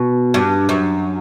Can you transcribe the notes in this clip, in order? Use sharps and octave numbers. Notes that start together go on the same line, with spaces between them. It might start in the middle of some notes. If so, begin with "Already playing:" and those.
Already playing: B2
G2
F#2